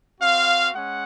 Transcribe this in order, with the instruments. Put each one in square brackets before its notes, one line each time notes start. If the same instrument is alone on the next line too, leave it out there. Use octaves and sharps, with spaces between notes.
[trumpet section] C4 F#4 F5
G#3 C#4 F#5